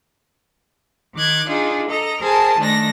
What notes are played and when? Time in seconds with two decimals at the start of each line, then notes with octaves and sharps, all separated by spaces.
1.15 D#3 D6 F#6 G#6
1.48 D4 D#4 F4 G#4
1.89 A4 D#5 A#5
2.21 G#4 A#4 C5 G#5 A5
2.58 D#3 A3 D4 A#6